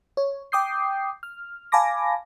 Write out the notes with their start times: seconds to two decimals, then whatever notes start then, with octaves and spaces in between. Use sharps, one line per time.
0.17 C#5
0.52 G5 D6 D#6 G6 C7
1.23 F6
1.72 F5 G#5 A5 B5 D6 A#6